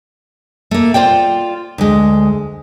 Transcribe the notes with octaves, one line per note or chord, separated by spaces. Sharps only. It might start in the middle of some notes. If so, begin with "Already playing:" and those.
A3 A#3
F4 C5 D5 G5
D2 G#3